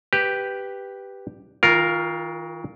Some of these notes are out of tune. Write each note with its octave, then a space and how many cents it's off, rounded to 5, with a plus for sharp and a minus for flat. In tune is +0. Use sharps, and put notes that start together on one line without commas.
G4 +0 B4 +0
D#3 +45 F4 +0 A#4 +0